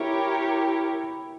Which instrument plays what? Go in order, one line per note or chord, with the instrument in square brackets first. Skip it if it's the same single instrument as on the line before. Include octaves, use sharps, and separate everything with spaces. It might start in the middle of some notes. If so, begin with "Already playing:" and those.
Already playing: [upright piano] E4 [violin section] G4 A#4 C#5